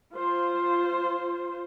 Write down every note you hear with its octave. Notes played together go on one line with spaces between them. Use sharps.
F4 C5